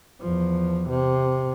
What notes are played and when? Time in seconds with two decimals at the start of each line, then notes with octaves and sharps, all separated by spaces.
0.20 E2 F3
0.89 C3